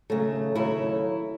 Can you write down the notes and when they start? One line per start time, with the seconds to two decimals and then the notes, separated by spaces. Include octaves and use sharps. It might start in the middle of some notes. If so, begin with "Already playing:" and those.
0.10 D#2 C#3 F#3 A3
0.55 D#2 C#3 F#3 A3 E4